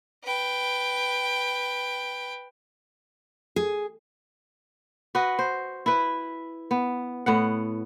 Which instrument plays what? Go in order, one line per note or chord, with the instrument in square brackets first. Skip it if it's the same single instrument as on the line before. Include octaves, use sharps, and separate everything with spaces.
[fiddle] B4 G5
[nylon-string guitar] G#4
[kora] F#4 B4 D#5 F#5
C5
E4 B4
B3
A2 B3 F#5